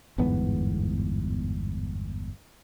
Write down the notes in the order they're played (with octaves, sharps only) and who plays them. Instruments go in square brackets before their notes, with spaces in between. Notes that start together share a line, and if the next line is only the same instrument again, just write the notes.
[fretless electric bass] G1 E2 G#2 B3